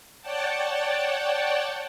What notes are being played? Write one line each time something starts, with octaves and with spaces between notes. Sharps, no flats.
C#5 D5 F#5 G5 A5